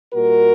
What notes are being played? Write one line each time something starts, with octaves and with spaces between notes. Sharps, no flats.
A#2 G3 F#4 A#4